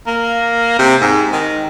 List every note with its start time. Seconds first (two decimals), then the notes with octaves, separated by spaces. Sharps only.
0.07 A#3
0.79 C3
1.01 G#2
1.33 D#3